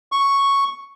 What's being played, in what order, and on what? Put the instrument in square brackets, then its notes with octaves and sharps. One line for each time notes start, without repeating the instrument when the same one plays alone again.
[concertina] C#6